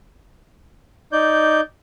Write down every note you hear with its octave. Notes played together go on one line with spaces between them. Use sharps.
D#4 D5 G6